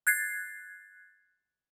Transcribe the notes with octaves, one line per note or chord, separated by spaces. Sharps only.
F#6 G#6 A6 C7